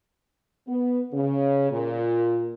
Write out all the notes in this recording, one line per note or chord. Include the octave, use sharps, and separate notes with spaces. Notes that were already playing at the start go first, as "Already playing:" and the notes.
B3
C#3
A#2